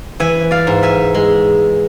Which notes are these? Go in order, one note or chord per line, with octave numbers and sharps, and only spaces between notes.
E3 E5 G#5
D5 F5
G#2
E5 G#5
G#3